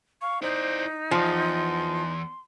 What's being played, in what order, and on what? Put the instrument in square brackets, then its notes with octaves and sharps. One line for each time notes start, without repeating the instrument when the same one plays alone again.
[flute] F5 [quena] C#6
[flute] D#4 [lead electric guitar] E4 D5 [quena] C5
[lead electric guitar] E2 [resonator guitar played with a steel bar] F3 [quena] C6